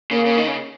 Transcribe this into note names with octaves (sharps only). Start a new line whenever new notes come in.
C#3 A#3
C#3
D#3
C#3